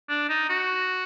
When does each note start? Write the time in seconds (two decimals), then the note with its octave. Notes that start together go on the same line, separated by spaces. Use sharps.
0.09 D4
0.30 D#4
0.50 F#4